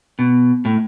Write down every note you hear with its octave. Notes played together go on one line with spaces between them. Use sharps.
B2
A2